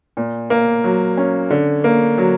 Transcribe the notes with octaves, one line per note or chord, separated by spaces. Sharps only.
A#2
A#3
F#3
C#4
D3
A#3
F#3